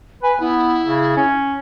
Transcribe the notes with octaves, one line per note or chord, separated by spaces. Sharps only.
B4 G#5
B3 E4
C#3
C#4